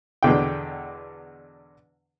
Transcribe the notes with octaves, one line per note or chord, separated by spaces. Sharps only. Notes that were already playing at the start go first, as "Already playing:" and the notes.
E2 B2 D3 G5